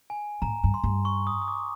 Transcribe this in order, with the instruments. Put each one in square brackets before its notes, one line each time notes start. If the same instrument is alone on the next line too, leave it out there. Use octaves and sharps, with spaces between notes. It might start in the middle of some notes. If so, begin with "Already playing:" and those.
[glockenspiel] G#5
[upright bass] A2 [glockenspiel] A#5
[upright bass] G2
[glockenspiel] C6
[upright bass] G2
[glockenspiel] C#6
D#6
D#6
D6